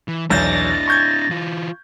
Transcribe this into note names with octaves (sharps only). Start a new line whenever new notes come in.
E3
B1 E2 D4 E4 G6 A6 A#6
C#6 G6 G#6
E3 F4